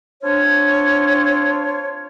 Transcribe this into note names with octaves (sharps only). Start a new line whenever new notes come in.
C4 D4 F4 C#5